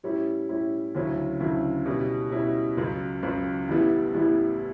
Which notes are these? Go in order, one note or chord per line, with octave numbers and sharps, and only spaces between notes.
A2 G3 C#4 E4
A2 G3 C#4 E4
D2 C#3 F#3 C#4 E4
D2 C#3 F#3 C#4 E4
B2 G3 C#4 E4
B2 G3 C#4 E4
C#2 C#3 F#3
C#2 C#3 F#3
A1 A2 G3 B3 E4
A1 A2 G3 B3 E4